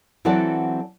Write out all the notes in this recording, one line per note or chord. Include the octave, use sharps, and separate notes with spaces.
E3 F#3 C4 A4 D5 F#5